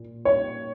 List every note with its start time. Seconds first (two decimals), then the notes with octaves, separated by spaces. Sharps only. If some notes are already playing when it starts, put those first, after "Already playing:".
Already playing: A#2
0.25 C#5